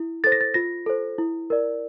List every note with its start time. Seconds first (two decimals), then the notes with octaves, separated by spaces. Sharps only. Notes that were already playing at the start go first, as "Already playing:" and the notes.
Already playing: E4
0.24 A4 C5 A6
0.32 A#6
0.41 A6
0.54 F4 A#6
0.86 A4 C5
1.18 E4
1.50 A#4 D5